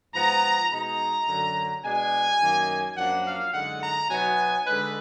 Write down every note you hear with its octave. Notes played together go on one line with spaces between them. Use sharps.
G#2 F3 B3 A#5
B2 G#3 D#4 A#5
F#2 D3 F#3
B2 G#3 D4 G#5
F#2 D#3 A#3
F#2 F3 A#3 D4 F#5
F5
F#2 D3 G#3 D#4 F#5
A#5
B2 F#3 B3 D#4 G#5
D3 G#3 D#4 B4